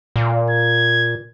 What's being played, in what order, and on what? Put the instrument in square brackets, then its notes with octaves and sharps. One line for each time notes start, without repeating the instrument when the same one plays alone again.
[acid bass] A#2
[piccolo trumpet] G#6